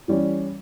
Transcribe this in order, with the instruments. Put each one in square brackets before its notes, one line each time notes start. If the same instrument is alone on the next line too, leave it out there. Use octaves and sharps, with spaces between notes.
[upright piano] E3 G3 C#4